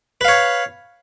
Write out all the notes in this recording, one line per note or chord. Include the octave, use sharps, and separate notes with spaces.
B4 C#5 F5